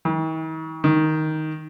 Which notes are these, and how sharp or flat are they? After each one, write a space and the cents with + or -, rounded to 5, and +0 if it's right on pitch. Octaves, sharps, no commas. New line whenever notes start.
D#3 +45
D#3 +5